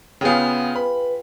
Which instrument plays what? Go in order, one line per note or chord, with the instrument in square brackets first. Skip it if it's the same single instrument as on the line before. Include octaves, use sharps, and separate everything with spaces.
[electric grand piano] C#3 B3 [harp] F4 G#4 G5
[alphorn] B4 [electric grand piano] B5